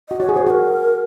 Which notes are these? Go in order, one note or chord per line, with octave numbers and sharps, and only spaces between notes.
F#4 D#5
F#4 C#5
G#4
F#4 C5
F#4 A#4 C5